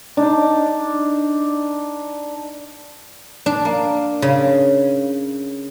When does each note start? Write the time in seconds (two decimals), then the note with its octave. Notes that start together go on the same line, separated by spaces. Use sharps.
0.17 D4 D#4
3.46 D4
3.65 A#3
4.22 C#3